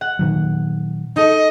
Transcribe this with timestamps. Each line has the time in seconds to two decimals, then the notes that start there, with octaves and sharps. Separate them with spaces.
0.01 F#5
0.19 A#2 D#3 F#3
1.16 D#4 A4 D#5